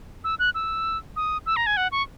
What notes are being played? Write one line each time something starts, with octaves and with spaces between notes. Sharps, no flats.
E6
F#6
E6
D#6
E6
A#5
G#5
F#5
C#6